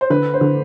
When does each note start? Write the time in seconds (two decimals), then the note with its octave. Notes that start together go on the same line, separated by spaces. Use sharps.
0.01 C5
0.10 D3 B4
0.34 C5
0.41 D3